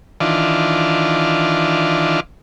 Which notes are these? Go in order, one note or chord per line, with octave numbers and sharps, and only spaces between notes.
D#3 E3 D4 F4